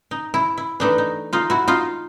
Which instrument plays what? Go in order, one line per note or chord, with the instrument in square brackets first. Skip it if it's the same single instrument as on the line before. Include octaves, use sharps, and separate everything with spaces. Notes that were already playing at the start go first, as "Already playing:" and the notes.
[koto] D#4
E4
E4
E3 A3 D4 D#4
D#4
D#4 F4
E4 F#4
D#4 F4